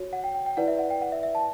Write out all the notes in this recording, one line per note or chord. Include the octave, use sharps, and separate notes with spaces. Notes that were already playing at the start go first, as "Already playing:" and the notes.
Already playing: F#4 C#5
F#5
G5
G5
G5
E4 B4 D5 F#5
E5
F#5
G5
F#5
E5
E5
A5